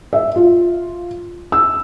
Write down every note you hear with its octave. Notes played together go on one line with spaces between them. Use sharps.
E5
F4
E6